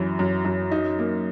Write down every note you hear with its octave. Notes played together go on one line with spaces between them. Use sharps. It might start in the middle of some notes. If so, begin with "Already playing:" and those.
Already playing: F#2 E3
F#2
F#2
D#4
A#3